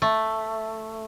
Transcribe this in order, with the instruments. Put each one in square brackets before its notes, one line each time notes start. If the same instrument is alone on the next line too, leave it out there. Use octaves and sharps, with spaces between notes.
[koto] A3